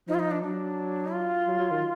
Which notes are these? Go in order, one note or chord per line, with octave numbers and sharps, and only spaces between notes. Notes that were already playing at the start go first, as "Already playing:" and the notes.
F3 D#4
F4
D#4
D4
F#3 D4
F4
F#3
F#3
D#3